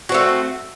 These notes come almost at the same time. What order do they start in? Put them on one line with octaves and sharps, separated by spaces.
F#4 C4 A3